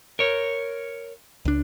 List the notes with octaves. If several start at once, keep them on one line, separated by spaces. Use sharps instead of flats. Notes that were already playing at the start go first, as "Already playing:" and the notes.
A#4 C#5
C#2 D4